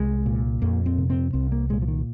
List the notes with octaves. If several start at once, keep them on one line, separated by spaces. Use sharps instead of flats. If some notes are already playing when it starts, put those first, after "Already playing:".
Already playing: C2 G#3
A#2
F2 A#3
C4
C3
C4
C2 C4
A#3
A#2 G#3
F3
D#3